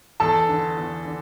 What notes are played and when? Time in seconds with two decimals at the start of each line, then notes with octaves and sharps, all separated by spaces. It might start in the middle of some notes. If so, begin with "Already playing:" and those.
0.20 E2 A4 A5
0.48 D3
0.77 E2
1.05 D3